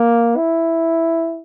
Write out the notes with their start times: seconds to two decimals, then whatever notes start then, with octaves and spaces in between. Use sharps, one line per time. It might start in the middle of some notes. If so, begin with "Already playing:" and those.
Already playing: A#3
0.37 E4